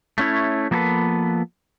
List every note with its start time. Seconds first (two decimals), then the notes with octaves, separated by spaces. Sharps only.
0.18 A3 C#4 E4 C#5
0.71 F3 A#3 B3 G#4 A4 B4